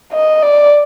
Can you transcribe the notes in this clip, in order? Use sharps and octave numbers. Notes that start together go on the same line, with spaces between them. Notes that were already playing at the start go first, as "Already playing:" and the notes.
D#5
D5